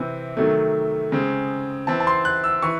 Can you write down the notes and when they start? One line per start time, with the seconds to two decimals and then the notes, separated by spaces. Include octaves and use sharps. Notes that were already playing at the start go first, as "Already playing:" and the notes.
Already playing: C3 E3 C4
0.37 C3 D#3 F#3 A3
1.12 C#3 G#3 C4
1.87 E3 C4 A5
2.00 A5
2.07 C6
2.25 F#6
2.44 E6
2.62 E3 C#6